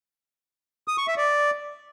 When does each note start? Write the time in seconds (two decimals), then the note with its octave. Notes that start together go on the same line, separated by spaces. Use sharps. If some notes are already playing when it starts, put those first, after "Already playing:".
0.88 D#6
0.98 C#6
1.08 E5
1.17 D5